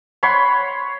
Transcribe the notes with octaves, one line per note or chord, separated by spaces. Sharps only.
C#5 F#5 B5 C6